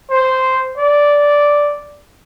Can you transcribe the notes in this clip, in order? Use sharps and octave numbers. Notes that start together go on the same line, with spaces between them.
C5
D5